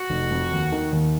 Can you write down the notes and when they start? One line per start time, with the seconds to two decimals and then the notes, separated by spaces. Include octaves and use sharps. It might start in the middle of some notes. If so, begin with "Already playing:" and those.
Already playing: F#4
0.10 F1
0.31 F2
0.52 D#2
0.72 D#3
0.93 D#2